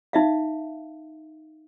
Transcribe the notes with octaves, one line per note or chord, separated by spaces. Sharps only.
D#4 E5 F5